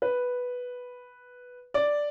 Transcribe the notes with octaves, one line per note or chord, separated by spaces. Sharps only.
B4
D5